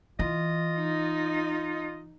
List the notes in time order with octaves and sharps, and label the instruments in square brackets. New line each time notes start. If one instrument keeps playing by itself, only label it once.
[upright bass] E3 [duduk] F4 [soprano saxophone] D#5
[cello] D#4